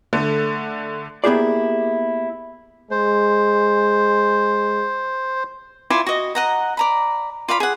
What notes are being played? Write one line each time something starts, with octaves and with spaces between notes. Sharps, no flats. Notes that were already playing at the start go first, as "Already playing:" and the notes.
D3 A3
A#3 B3 E4 G4 G#4 D5
G#3 C5
E4 F4 D5 G#5
F#4 D#5
D#5 F#5 A#5
D5 A#5 B5
F4 D5 F5 B5
G#4 F#5